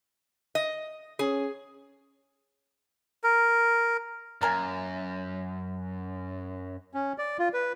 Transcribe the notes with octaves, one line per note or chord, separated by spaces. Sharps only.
D#5
C#4 G#4
A#4
F#2 A#3 A#4 G#5
C#4
D5
F4
B4